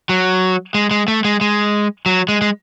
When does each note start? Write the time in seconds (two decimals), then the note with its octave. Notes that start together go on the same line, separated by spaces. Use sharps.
0.09 F#3
0.74 G#3
0.91 G#3
1.08 A3
1.25 G#3
1.41 G#3
2.06 F#3
2.29 G#3
2.42 G#3